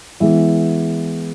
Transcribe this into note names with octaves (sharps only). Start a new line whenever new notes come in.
E3 G#3 B3 E5